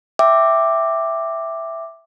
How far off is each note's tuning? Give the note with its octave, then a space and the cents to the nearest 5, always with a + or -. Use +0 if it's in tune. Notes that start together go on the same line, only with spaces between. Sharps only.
E5 +0 G5 +0 D6 +5